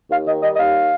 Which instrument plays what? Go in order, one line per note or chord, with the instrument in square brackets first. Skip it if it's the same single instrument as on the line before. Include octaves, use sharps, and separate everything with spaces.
[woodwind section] D#2 F5
D#3 D#5
G3 D#5
D#5
D#2 F5